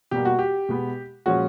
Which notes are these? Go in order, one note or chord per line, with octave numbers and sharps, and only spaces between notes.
B2 G3 A#3 G4
F#4
G4
B2 G#3 B3
A#2 F3 G#3 C#4 F#4